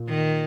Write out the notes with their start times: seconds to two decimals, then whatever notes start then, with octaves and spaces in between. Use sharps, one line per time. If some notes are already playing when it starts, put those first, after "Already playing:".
Already playing: A#2
0.09 D#3